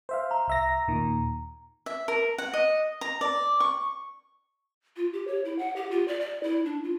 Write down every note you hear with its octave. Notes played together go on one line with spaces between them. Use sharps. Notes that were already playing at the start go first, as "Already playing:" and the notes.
C5 E5 F5
A#5
C2 E5 A#6
D#2 A#2 D#3
E5
A#4
F#5
D#5
A#5
D5
C#6
F4
G4
C#5
E4
F#5
G4
F4
D5
D5
E4
D4
F4